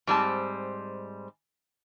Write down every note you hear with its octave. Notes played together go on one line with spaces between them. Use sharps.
G#2 G3 C4 A5